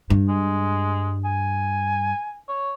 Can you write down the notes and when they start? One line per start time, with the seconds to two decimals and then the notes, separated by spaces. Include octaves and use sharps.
0.10 G2
0.28 G#3
1.25 G#5
2.49 C#5